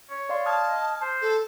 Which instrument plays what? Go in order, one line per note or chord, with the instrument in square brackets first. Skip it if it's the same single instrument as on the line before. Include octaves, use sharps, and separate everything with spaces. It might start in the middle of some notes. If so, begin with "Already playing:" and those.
[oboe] C#5
[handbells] D5 F5 C6
[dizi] A5 [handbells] D#6 F6 G#6
[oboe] D#5
C5
[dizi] A4